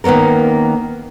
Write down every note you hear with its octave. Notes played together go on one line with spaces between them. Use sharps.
D#3 A#3 B3 C#4 A#4